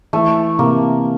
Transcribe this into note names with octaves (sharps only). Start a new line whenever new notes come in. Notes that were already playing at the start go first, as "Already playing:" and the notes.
E3 A3
C3 A#3